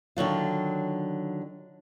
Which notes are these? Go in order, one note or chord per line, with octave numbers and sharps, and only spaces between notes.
D3 D#3 F#3 F4